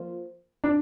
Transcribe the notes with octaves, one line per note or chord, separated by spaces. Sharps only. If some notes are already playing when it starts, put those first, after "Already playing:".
Already playing: F3 A#3 F4 C5
D4